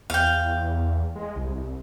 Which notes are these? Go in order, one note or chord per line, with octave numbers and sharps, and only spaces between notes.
E2 F5 G5
G#3
C2